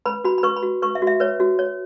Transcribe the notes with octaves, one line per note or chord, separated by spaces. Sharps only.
B4 B5
F#4 B5
B5
B4 C#6
B5
F#4
B4 C#6
E5
F#4
E5
B4 C#5
F#4
C#5